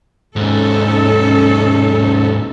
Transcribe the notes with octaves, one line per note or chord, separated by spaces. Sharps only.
D#2 G#2 C#4 D#4 A4